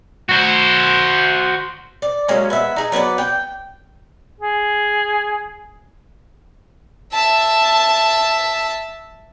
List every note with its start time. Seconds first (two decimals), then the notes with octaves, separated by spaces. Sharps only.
0.29 F#4 C5
2.02 D5
2.28 F#3 G#3 A#3 C#4
2.50 B3 E5
2.76 D#4 G#4
2.92 F#3 B3 B4 D5
3.18 G5
4.40 G#4
7.13 E5 A5